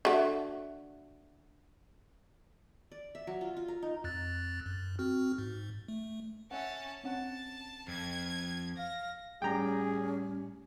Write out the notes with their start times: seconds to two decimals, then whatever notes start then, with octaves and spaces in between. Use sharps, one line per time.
0.05 D3 A3 F#4 E5
2.92 D5
3.15 E5
3.27 F#3
3.41 F4
3.57 F4
3.68 A#4
3.82 D#4
4.04 F2 F#6 A6
4.66 F#2
4.99 C4 F#4 F6
5.38 G#2
5.88 A3
6.51 C#4 E5 F#5 A5
7.04 C4 C#4 F#5 A5
7.88 F2 G#6
8.78 F5 A#6
9.42 A2 G3 C#4 G#4 G5 A#5